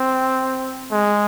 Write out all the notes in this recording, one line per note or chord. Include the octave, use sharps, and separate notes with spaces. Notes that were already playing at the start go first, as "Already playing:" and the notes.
Already playing: C4
G#3